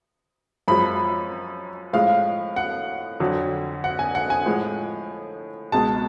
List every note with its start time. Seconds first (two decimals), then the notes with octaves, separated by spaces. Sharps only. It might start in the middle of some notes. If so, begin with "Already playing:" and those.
0.68 F#2 F3 G#3 B5
1.93 A2 F3 G#3 F5
2.56 F#5
3.20 F2 D3 F#3
3.84 F#5
3.99 G#5
4.15 F#5
4.30 G#5
4.46 A2 F3 G#3
5.72 C#2 B2 G#3 A5